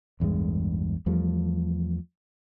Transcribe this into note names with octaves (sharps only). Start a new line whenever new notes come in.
A1 E2 G2 G#3
E2 F3 G3 A3